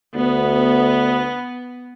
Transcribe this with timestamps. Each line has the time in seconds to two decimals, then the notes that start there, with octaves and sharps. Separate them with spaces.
0.14 D2 B3